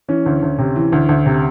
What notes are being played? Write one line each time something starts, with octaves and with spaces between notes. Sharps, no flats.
E3 C#4
D2
D2
C3
E3
D2
D2
C3